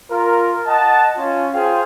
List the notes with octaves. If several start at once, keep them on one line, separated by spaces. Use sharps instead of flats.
F4 A#4
D#5 F#5 A5
C#4 F4
F4 G#4 C5 F5 G5